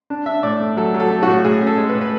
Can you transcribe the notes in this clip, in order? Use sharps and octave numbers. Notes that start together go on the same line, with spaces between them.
D4
D4 E5
A2 D5
A3
F#3 A4
F#3
A4
A3
A2 F#4
A2 G#4
C#4
A4
G#3
B4
A2
B4